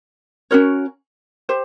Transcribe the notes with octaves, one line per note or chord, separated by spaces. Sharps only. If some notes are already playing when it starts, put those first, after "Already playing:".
C#4 F#4 A#4 C#5
G4 C5